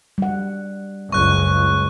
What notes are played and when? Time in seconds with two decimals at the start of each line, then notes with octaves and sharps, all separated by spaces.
0.18 G3 F#5
1.12 F#1 C#2 C#6 F#6